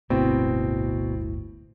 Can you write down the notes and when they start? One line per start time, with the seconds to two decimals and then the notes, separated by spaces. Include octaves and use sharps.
0.10 D1 G1 B2 A3 A#3 C4 E4